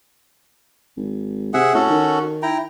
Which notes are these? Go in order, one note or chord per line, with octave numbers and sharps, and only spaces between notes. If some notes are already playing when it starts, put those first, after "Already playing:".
G#1
C3 G#4 E5 F#5
A2 C#4 F#4 A4
D#3
E4 G5 A#5